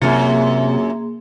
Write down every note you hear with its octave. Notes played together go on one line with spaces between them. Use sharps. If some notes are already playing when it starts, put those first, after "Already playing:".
F#2 C3 A#3 F4 G#4 C6